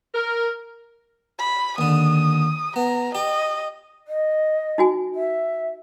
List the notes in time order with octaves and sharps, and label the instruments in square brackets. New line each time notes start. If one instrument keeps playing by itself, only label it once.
[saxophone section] A#4
[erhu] B5
[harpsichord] D#2 D3 [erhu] D#6
[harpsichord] B3 [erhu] A#5
[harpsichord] G4 [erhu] D#5
[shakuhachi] D#5
[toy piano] D#4 F#4 G#5
[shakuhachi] E5